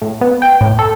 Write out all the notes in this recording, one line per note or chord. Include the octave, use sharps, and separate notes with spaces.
A2
B3
G5
A2
A4